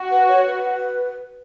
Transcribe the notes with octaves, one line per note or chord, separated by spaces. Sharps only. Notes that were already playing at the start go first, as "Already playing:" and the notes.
Already playing: F#4
B4
C#5
B4